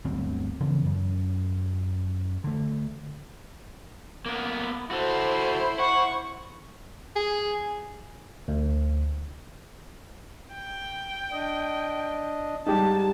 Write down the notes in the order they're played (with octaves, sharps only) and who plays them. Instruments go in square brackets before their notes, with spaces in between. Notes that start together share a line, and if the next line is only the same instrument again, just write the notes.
[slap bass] G1 D2 F#3 C4
C#3 E3 F3 B3
F#2
D3 A3
[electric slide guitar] A#3 B3
[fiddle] E4 C5 [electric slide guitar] F#4 A4
[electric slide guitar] F#5 [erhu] C#6
[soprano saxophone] G#4
[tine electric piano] D2
[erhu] G5
[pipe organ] D4 D#5
[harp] G#2 G3 [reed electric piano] D#4 G4 [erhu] A5